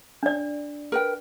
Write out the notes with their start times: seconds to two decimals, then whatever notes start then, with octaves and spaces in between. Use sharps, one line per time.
0.23 D4 D5
0.92 A#4 B4 G5